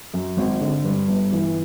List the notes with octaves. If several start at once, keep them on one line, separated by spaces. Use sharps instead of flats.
F#2
G#1
D3
G2
G1
E3